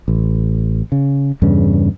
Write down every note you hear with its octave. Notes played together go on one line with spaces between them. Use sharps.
A1
C#3
E2 G2 C#3